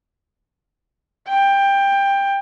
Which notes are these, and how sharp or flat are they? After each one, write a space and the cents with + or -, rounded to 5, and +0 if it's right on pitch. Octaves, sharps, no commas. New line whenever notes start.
G5 +15